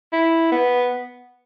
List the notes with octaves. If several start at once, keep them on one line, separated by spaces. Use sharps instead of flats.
E4
B3